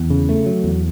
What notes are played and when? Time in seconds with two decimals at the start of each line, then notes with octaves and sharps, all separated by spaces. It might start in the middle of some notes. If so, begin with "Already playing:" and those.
Already playing: E2
0.10 C#3
0.29 A3
0.46 F#3
0.64 E2